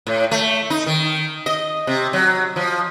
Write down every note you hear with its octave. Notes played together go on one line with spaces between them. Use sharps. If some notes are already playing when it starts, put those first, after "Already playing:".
A2
A3
D#4
D#3
D#5
C3
F#3
F3